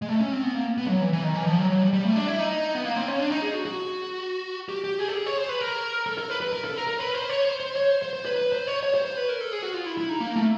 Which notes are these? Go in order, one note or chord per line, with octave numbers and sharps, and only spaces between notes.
G#3
A3
C#4
C4
B3
A#3
B3
G3
F#3
E3
E3
D#3
E3
F3
F#3
F#3
G3
G3
A3
D4
E4
D#4
B3
A#3
C4
C#4
D4
D#4
G#4
F#4
F#4
G4
G4
G#4
A4
G#4
C#5
C5
B4
A#4
A4
A#4
B4
B4
A#4
A4
A#4
A#4
B4
C5
C#5
C5
C5
C#5
C5
C5
C5
B4
B4
C5
C#5
C#5
C5
C5
B4
A#4
A4
G#4
F#4
F4
E4
E4
D#4
A#3
A3